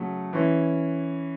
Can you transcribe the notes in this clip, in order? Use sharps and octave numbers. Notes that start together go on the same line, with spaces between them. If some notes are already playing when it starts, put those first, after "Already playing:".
Already playing: C#3 F#3 A3
E3 C#4 E4